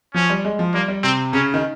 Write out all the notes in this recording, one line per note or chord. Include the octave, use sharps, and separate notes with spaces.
F3 C#4
G3
G#3
F3
G3 A#3
G3
C3 C4
C#3 C#4
D#3